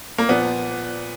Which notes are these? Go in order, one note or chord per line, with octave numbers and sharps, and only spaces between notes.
A#3
A#2 F3 B3